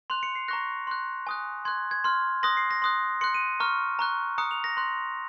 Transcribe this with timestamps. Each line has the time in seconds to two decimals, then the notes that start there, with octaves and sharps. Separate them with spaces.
0.10 C6 F#6 F7
0.23 C#7
0.35 C7
0.48 A#5 C#6 F#6 A#6
0.87 C6 F#6
1.27 G#5 D#6 F#6
1.65 C6 F#6 G#6
1.91 G#6
2.04 C6 F6
2.43 C6 D#6 F#6 A#6
2.57 C7
2.71 A#6
2.82 C6 D#6 F#6
3.21 C6 F#6 C#7
3.34 D#7
3.60 A#5 C#6 F6
3.99 A#5 C#6 F#6
4.38 A#5 D#6 F#6 C#7
4.51 F7
4.64 A#6
4.77 C6 F#6